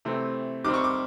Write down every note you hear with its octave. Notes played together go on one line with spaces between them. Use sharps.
C3 E3 A3 C4
D#3 G3 C4 D6
C#6
D6